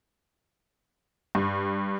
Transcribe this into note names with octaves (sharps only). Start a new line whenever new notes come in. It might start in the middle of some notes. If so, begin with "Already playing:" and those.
G2